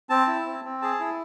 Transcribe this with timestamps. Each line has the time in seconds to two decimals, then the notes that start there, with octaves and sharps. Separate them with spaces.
0.10 C4 A5
0.27 E4
0.46 C4
0.65 C4
0.82 G#4 A5
1.00 E4